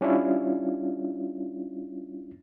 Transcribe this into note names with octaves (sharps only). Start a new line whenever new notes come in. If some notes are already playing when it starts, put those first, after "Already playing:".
G3 C#4 D4 E4 F4